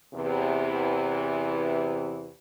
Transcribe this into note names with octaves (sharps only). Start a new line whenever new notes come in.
E2 C3 E3